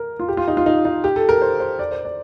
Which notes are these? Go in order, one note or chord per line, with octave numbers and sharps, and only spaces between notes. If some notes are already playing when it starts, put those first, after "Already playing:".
Already playing: A#4
F4
G4
F4
D#4
F4
D#4
D#4
G4
A4
A#4
C5
C5
D5
C5
D5